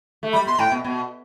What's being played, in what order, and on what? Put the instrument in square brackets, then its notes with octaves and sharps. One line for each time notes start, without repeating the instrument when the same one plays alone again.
[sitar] A3
[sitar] G3 [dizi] B5
[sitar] B2 [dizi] C6
[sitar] A2 [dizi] G5
[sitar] B2
B2